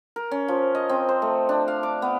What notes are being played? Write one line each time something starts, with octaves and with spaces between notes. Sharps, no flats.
A#4
C#4
F3
D#5
C4
C5
A3
D4
F5
D6
B3